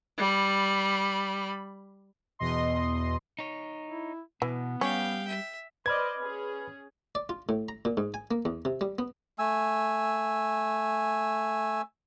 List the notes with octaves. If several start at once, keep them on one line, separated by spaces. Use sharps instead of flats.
G3 B5
E2 B2 D#5 C6
D#4 C#5
E4
B2 E3 B3
G3 C#4 F5 G5
E5
B4 C5 D5 D#5 B5 F6 G#6
C#4 G#4
D5
F4
A2
A#5
A#2
G#2
G#5
A#3
E2
C3
G3
B3
A3 G#5 E6